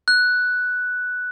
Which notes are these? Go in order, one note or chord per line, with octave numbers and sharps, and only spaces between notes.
F#6